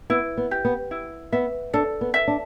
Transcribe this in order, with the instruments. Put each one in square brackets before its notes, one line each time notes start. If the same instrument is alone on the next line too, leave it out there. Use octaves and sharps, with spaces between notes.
[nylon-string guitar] B3 [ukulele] E4
[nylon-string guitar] B3
[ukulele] G4
[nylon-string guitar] B3
[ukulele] E4
[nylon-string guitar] B3 [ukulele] E5
[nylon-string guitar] D4 [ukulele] A4
[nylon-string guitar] B3
[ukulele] E5
[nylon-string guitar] D4